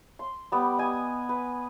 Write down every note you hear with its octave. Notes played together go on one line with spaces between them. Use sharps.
C6
G3 B3 G5 D6
D#5 G#5
B4